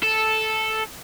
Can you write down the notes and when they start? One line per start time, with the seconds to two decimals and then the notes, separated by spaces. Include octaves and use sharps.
0.03 A4